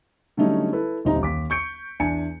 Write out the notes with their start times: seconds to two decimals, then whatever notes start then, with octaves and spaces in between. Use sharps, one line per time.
0.37 D3 F#3 G3 A3 C#4 D#4
0.73 E4 A4 B4
1.05 D#1 D2 C4 D#4 G4 A#5
1.21 D#2 D6 B6
1.50 C#6 G6 C#7 D7
2.00 E2 D4 G#5 C#7